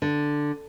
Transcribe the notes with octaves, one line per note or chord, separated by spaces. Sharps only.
D3